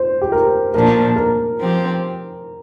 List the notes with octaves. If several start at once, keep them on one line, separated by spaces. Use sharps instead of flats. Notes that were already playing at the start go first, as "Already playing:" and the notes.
Already playing: C5
G4
A#4
A#2 F3 D4 A#4
A#4
F3 C4 G4